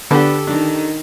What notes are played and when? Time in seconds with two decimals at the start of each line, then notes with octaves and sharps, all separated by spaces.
0.11 D3 B3 D4 G4 A4
0.47 D#3 D4